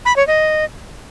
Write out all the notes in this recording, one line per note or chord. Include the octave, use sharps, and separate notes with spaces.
B5
C#5
D#5